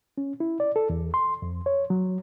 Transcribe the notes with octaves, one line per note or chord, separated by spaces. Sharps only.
C#4
E4
D5
A4
E2
C6
F2
C#5
F#3